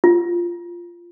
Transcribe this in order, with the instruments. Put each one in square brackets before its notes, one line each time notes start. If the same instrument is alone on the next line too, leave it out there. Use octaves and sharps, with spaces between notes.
[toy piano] F4